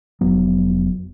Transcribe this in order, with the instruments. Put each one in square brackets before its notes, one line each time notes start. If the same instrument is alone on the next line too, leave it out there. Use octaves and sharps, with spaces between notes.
[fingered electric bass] F1 F#3 B3